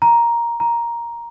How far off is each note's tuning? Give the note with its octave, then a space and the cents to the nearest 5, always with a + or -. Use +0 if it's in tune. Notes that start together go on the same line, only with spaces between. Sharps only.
A#5 +10
A#5 +10